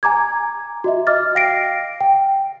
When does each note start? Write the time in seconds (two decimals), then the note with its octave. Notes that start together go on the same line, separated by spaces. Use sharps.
0.03 G#5 A#5 D6 G#6
0.84 F#4 D#5 E5
1.07 D#5 D6 F6 A6
1.35 F5 G5 A#6 C7 D7
2.01 G5